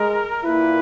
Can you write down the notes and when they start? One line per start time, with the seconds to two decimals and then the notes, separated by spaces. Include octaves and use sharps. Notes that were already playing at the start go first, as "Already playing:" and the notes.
Already playing: G#3 A#4
0.44 A#2 A#3 E4 B4